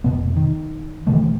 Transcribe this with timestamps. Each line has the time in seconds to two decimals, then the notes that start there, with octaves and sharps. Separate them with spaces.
0.04 F1 B2 B3
0.37 D#3
1.07 B2 D#3 E3 A3